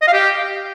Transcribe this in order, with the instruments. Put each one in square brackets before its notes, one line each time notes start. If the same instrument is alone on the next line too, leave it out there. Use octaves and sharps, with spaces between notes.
[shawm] D#5
F5
G4